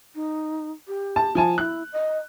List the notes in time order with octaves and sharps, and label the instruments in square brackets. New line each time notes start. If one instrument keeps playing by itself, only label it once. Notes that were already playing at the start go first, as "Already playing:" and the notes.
[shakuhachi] D#4
G4
[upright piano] A5
F3 G#5 A5
[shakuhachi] E4 [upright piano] F#6
[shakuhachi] D#5